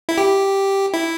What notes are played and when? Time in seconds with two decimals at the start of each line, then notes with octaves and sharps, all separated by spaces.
0.09 E4
0.18 G4
0.94 E4